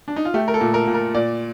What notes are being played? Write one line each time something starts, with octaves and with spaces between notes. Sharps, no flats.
D4
D#4
F4
A3 G4
A#4
A4
A#2
A#4
A#2
A#4
A#2 D5